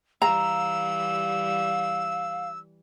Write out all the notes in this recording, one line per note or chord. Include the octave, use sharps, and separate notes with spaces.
E3 G3 F5 A#5 E6